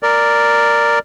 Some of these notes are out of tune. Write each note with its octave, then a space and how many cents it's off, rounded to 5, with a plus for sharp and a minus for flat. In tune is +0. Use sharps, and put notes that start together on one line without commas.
A#4 -5 D5 +0